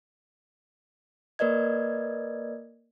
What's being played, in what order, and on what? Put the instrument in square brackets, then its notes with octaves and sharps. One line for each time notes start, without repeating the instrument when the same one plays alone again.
[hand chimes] A#3 A#4 B4 D5 D#5 G#6